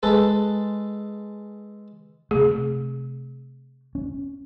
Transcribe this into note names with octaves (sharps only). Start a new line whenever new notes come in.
G#3 A4 B4
C3 A3 G#4
C#4